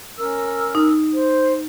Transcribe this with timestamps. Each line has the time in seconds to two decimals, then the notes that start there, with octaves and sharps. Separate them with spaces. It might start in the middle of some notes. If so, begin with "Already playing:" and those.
0.18 C#4 A#4 E6
0.75 D#4
1.13 C5